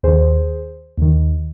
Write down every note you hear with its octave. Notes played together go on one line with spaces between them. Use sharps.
D#2 D#3 G#4 C5
D#2 D#3